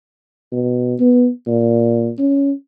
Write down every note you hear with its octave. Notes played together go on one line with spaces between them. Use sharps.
B2
B3
A#2
C#4